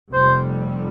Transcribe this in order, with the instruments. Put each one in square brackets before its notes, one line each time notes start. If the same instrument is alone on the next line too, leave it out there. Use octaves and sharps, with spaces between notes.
[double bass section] F1 F2 C3 G3 [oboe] C5